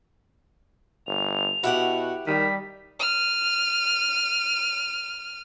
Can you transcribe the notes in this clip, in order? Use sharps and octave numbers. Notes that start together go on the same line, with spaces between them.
G1 F7
B2 E4 F#4 G4 F#5
D#3 G3 B6
F6 D#7